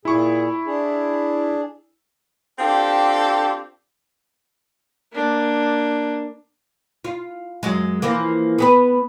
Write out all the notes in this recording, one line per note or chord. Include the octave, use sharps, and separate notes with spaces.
A#2 E4 G#4 C#6
D4 G#4
C4 D4 F4 G4 A4
A#3 D4
F4
F#2 F#3 G#3
E3 F3 A#3
B3 G#4 B4